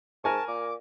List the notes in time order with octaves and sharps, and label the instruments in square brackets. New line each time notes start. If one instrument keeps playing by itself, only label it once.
[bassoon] G#2 [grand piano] A#4 G#5 C#6 [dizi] A5
[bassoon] A#2 [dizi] D6